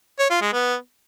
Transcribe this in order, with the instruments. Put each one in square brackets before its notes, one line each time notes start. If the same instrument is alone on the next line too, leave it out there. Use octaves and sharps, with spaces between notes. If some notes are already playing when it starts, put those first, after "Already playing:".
[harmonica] C#5
F4
G#3
B3